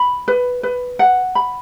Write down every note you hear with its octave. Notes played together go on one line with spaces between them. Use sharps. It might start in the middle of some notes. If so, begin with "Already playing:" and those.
Already playing: B5
B4
B4
F#5
B5